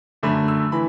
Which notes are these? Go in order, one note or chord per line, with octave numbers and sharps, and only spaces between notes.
F#2 D3 A3 B5
E6
E3 B5